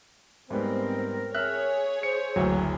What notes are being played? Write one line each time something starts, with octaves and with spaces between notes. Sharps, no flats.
G#2 G3 B3 C4 A#4
G#4 C#5 E5 F6 F#6
C5 C#7
F#1 D2 E3 F#3